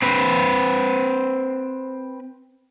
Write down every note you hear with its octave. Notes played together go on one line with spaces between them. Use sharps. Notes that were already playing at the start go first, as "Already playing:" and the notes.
C4 B4